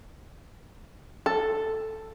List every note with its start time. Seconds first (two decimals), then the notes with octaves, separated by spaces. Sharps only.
1.26 A4